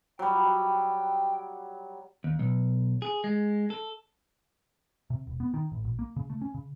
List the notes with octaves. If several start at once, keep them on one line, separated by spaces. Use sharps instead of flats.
F#3 G3 G5
D#2
B1
G#4
G#3
A4
C3
E1
B3
D#3
A1
A#1
A#3
C#3
A3
C#4
C#3